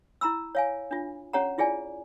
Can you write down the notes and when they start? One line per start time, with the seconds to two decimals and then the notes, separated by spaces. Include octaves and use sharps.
0.21 E4 A#5 B5 E6
0.55 C#5 F5 G#5
0.91 D4 F4
1.33 C#4 G4 C#5 F#5 A#5
1.58 E4 F4 G#4 D5 G#5